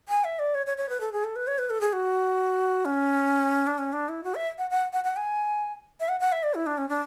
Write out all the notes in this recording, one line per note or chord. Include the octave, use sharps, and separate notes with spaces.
G#5
E5
D5
C#5
C#5
C#5
B4
A4
G#4
A4
B4
C#5
B4
A4
G#4
F#4
C#4
D4
C#4
D4
E4
F#4
E5
F#5
F#5
F#5
F#5
G#5
E5
F#5
F#5
E5
D5
E4
D4
C#4
D4